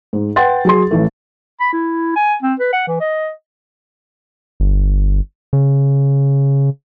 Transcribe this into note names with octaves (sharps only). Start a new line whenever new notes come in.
G#2
B4 F#5 G5 C6 A6
F#3 G#4 C6
A1 E3 A3
B5
E4
G#5
C4
B4
F#5
E3
D#5
G1
C#3